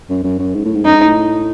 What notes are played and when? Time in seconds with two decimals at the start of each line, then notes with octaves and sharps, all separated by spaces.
0.10 F#2
0.24 F#2
0.39 F#2
0.55 G#2
0.65 A2
0.75 G#2
0.85 F#2 D#4
0.95 G#2
1.06 A2